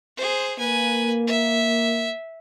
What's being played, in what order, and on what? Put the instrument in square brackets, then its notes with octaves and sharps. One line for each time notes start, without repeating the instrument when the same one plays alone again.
[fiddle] G#4 C5
[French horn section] A#3 [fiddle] B4 G#5
[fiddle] E5